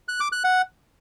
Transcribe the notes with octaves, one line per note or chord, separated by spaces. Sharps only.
F#6
D6
F#6
F#5